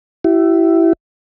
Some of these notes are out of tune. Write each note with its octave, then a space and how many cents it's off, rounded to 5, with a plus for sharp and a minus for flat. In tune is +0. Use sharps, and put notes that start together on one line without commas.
E4 +5 G4 -40